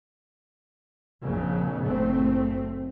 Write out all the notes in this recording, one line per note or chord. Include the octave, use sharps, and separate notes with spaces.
A#1 F2 A#2 C#3
F#1 A#2 A3 C4